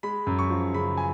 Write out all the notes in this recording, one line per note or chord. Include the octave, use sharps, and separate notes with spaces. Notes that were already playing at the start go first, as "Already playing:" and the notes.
G#3 B5
F#2
C#6
F3
C#3 B5
G#5